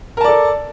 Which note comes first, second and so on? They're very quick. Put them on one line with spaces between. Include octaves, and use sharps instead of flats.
A#4 A5 D5 A4